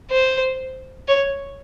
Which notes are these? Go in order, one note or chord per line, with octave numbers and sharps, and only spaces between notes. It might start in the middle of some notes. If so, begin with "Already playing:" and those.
C5
C#5